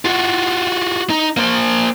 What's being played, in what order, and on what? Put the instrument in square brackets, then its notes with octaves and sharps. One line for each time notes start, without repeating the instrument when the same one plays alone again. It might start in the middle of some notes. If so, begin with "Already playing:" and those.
[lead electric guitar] F4 F#4
D#4
A#3 C5